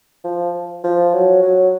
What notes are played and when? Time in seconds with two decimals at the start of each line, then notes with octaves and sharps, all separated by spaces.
0.24 F3
0.84 F3
1.14 F#3
1.42 F#3